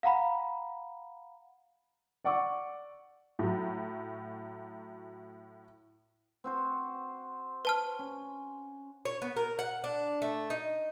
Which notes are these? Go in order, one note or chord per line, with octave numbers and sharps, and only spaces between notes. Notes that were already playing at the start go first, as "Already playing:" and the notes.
F5 F#5 A#5 B5
D5 F#5 C#6 D6 E6
A2 F#3
C4 F#4 C5
B4 A5 F6
C#4
C#5
B3
A#4
F#5
D4
A3
D#4